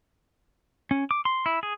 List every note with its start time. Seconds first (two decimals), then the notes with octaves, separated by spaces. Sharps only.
0.91 C#4
1.11 D6
1.25 C6
1.46 E4
1.63 G#4